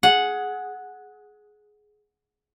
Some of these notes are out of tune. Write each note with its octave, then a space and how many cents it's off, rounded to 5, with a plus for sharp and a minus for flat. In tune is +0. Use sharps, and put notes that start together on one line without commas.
G#4 +15 F#5 -5